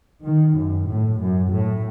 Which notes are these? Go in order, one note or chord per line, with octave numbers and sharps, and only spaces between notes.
D#3
F#2
A2
F#2
A2